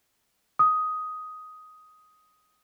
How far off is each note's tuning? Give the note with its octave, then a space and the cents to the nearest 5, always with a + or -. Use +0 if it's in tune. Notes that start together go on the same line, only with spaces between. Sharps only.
D#6 +5